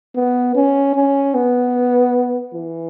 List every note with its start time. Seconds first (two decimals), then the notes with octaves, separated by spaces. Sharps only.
0.16 B3
0.55 C#4
0.95 C#4
1.35 B3
2.54 E3